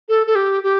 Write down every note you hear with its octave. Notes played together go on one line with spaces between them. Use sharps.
A4
A4
G4
G4